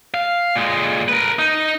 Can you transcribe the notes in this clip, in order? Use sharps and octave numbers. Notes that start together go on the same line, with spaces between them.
F5
A#2 G#3
A#4 B4
D#4